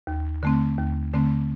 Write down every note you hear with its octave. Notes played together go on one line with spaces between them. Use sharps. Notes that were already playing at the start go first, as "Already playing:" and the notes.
D#2
D3 A3 C4
D#2
D3 A3 C4